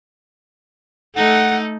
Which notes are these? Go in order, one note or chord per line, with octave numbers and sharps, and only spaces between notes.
A3 D#4 A4 F#5